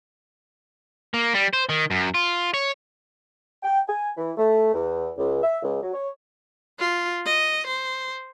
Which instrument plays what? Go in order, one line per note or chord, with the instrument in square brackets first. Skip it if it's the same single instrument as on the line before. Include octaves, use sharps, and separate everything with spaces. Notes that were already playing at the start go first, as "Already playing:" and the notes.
[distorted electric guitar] A#3
G3
C5
D#3
F#2
F4
C#5
[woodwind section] G5
G#5
E3
A3
E2
C#2
E5
C#2
F#3
C#5
[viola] F4
D#5
C5